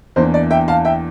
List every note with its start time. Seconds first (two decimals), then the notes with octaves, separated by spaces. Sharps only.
0.16 E2 E3 A#3 D4 C5
0.34 D5
0.51 E5 G5
0.68 F5 A5
0.85 E5 G5